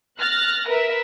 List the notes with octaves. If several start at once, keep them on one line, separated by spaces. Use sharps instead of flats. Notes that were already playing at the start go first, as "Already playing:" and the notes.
F6 F#6 A6 A#6
A#4 B4 E5